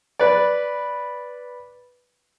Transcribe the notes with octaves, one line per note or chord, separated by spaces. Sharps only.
B4 D5